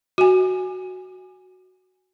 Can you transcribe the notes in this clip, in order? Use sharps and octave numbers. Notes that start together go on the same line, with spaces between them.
F#4 G#5